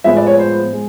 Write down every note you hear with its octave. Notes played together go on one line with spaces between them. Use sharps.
A2 F3 G#3 B3 E5
D5
C#5
C5
G#3